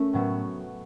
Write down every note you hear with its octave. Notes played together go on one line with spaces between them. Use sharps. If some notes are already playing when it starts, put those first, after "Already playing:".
Already playing: A3 C#4
A2 F#3 B3